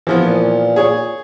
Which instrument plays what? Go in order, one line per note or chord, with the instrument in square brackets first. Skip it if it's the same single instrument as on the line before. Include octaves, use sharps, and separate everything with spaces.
[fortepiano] E3 F3 B3
[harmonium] A#2
[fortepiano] G#4 C#5